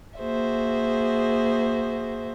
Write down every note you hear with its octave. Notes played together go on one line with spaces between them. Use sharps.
A#3 F#4 G#4 C5 E5